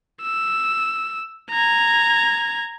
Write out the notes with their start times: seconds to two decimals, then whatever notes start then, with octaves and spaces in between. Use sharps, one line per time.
0.22 E6
1.51 A#5 G#6